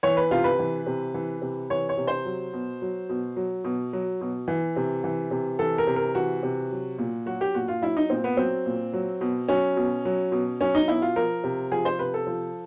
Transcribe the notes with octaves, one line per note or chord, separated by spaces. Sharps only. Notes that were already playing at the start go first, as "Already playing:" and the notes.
E3 C#5
B4
C3 F4
B4
E3
C3
E3
C3
E3 C#5
C#5
C3
C5
F#3
B2
F#3
B2
F#3
B2
F#3
B2
E3
C3
E3
C3
E3 A4
A#4
C3
A#4
E3 F#4
C3
F#3
A#2
F#3 F#4
G4
A#2 F#4
F4
F#3 E4
D#4
A#2 C4
B3
F#3 C4
A#2
F#3
B2
F#3 C#4
B2
F#3
B2
F#3 C#4
D#4
B2 E4
F4
F3 A#4
C3
F3 G#4
C5
C3 B4
A4
F3